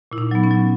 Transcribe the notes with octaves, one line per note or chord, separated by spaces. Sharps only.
A#2 E4
D#4
F#3 B3
C#4
F#3